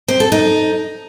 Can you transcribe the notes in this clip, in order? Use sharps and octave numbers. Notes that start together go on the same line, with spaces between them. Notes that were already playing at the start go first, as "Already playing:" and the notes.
C4
A4
D#4